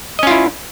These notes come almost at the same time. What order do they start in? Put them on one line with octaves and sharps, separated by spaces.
D#5 C#4 F4 E4